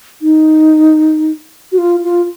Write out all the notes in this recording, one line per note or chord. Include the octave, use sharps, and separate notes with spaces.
D#4
F#4
F4
F4